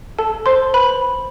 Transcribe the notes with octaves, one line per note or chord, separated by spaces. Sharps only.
A4 A5
C5 C6
B4 B5